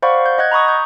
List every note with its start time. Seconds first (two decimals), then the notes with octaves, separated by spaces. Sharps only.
0.02 C5 D5 F5 F#5 B5 C#6
0.26 G6
0.38 D#5 F#5 F#6 G#6
0.51 A#5 B5 C#6 D#6
0.68 G6